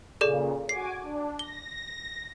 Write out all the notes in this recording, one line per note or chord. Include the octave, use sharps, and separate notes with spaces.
A#2 C#3 G#4 A4 D5
F#4 G#5 D6 C7
D4
A#6 G7